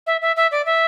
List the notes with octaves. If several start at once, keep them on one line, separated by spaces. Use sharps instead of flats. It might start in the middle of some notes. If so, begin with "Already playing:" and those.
E5
E5
E5
D5
E5